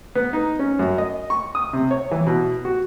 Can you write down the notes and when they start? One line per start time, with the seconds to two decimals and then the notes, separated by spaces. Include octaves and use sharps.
0.15 B3
0.33 D#4
0.59 C#4
0.79 F#2
0.98 D#5
1.30 C#6
1.55 D#6
1.73 C3
1.91 C#5
2.11 E3
2.27 B2
2.65 F#4